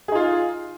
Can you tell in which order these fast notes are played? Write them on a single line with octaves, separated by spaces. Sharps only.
G#4 D#4 F4